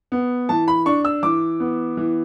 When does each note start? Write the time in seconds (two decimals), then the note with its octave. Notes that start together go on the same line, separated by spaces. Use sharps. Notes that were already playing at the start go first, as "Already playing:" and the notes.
0.12 B3
0.49 E3 A5
0.68 B5
0.86 D4 C#6
1.05 E6
1.23 E3 D6
1.60 B3
1.97 E3